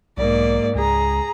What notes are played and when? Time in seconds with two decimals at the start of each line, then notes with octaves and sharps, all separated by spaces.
0.17 B1 G#2 A#3 D5
0.75 C#2 G#4 A#5